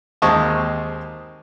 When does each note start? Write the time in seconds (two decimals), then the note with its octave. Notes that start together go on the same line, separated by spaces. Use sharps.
0.22 D#2 G#3 C4 A5 C#6 D#6